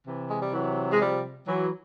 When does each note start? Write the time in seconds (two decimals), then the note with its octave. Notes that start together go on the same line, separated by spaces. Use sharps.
0.06 C3 E3
0.29 G#3
0.41 G3
0.54 E3 F#3
0.92 G#3
1.00 F3 G3
1.47 E3 F#3